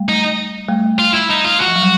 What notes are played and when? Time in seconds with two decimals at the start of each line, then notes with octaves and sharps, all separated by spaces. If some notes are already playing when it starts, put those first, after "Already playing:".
Already playing: G3 A3
0.09 D#4
0.68 G3 A3
0.99 F4
1.14 E4
1.29 D#4
1.44 F4
1.60 F#4
1.68 F3
1.76 F#3
1.83 G3